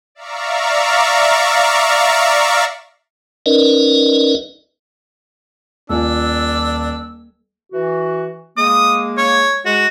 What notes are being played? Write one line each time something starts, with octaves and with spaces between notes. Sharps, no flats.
D5 E5 F5 A#5 C#6
C#4 D#4 A#4 B4 D5 D#5
D#1 D4 F4 G#5 E6
E3 F#4
G#3 A#3 D#6
C#5
G#3 F#4